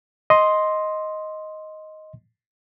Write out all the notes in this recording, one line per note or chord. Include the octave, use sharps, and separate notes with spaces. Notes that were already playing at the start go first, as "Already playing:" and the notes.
D#5 C6